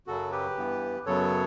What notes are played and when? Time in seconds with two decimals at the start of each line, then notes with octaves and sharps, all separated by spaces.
0.07 F#2 C#3 F#3 F#4 A4
0.32 G4 B4
0.57 G2 E3 B3
1.06 F#2 C#3 F#3 B3 A4 C#5